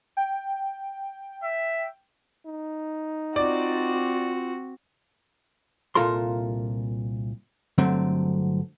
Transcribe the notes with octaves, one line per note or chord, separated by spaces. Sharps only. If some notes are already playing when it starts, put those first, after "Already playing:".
G5
E5
D#4
C4 F4 F#4 D5
C2 A#2 F4 A4 A#4 C6
G2 D3 F#3 A3 C4